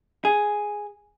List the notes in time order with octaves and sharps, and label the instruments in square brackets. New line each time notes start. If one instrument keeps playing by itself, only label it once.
[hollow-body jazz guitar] G#4